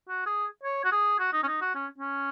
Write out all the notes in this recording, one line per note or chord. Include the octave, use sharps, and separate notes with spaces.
F#4
G#4
C#5
F#4
G#4
F#4
D#4
C#4
D#4
F#4
C#4
C#4